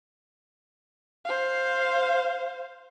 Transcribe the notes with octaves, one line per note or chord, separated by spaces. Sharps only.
C5 F5